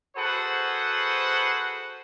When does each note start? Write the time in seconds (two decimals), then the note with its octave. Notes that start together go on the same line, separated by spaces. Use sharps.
0.17 F#4 G#4 A4 B4 C5 F#5